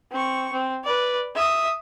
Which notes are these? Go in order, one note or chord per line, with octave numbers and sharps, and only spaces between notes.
C4 C#6
C4
B4 D5
E5 D#6